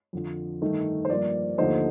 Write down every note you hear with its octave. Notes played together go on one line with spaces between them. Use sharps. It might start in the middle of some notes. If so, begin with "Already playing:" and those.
F2 D3 F3
G2 D#3 A3 D#4
C5
G2 F3 A#3 D5
D#2 D3 F3 A3 D#4 C5